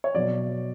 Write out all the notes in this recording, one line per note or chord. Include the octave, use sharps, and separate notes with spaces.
C#5
B2 F#3 D5